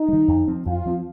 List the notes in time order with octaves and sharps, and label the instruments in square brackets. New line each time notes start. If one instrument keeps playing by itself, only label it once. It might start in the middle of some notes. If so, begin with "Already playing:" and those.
Already playing: [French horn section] D#4
[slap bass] D#3 G3
F2
F3 C4
[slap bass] F2 [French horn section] F4
[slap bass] F3 C4